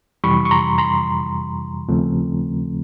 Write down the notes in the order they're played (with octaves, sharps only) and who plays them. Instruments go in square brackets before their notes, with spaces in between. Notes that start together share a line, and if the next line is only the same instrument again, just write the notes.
[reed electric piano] F2 C3 E3 G3 B5 C#6
C#6
A#5 C6
A#5 C6
D#2 C#3 F3 A3 C4